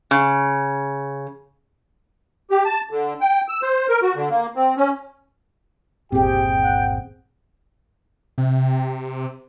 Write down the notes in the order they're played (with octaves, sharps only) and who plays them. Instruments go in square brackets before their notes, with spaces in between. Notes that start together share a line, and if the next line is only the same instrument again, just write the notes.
[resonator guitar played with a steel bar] C#3
[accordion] G4
A5
D3
G5
E6
C5
A#4
F#4
D3
A#3
C4
C#4
[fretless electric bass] G1 D#2 A#2 [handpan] C4 G#4 [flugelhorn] G4 [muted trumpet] G5
[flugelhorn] F#5
[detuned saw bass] C3